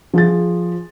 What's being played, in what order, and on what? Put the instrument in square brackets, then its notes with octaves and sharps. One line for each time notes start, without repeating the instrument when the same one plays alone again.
[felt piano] F3 G#4 A6